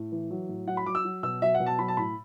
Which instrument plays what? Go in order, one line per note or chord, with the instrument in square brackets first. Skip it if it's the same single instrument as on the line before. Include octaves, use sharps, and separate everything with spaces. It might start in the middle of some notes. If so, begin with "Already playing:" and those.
Already playing: [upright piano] A2
E3
F#3
A2
F#3 F#5
B5
F#3 D6
E6
F#3
B2 E6
F#3 E5
F#5
B2
A5
F#3 B5
A5
A2 B5